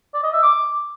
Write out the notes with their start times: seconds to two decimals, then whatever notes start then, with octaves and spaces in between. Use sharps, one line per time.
0.14 D5
0.24 D#5
0.33 E5
0.43 D6